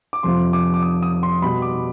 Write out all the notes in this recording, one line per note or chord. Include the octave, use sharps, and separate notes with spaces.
D6
F2 C3 F3 C6
D6
D6
D#6
D#6
C6
B2 G3 B5
D6